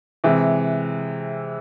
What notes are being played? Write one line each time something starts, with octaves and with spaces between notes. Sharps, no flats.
C3 E3 G#3